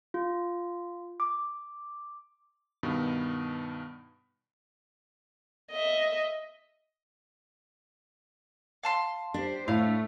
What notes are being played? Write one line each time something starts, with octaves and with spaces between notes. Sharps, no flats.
F4
D6
G2 B2 D#3 B3
D#5 E5
F5 A5 C6
D4 G4 C5
A2 A3 F5